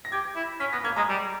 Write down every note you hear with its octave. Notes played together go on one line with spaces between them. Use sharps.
A#6
G4 G#6
E4
C#4 B6
B3 A#6
A#3 G#6
G#3 A#5
G3